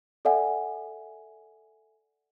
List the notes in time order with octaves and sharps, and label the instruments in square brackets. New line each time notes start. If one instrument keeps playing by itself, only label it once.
[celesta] A4 D5 E5 F#5 G#5